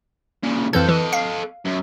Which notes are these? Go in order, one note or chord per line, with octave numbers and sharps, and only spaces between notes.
A#2 C#3
F2 E3 A4 C5 G6
E3 A4 D#5
F5
F#2